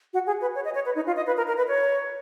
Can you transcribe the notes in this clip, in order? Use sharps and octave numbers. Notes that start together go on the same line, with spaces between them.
F#4
G#4
B4
C#5
D#5
C#5
B4
D#4
F4
D#5
B4
A#4
A#4
B4
C#5